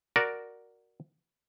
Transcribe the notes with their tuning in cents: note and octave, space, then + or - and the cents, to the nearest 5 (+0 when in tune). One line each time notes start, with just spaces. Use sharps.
F#4 +0 A#4 +0 D5 +0